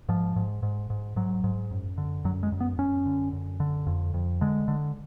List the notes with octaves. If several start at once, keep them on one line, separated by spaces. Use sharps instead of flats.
G#2 F3
G#2
G#2
G#2
G#2 F#3
G#2
F#2
D3
F#2 F#3
G#3
F#2
B3
F#2 C#4
D3
F#2
D3
F2
F2
D3 G#3
D3